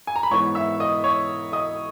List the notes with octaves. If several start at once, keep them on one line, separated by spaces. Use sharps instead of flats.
G#5
A#5
B5
G#2 E3 B3 C#5 C#6
E5 E6
D#5 D#6
C#5 C#6
D#5 D#6